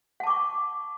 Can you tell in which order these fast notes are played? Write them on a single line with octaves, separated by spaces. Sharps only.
F#5 A5 D6 C#6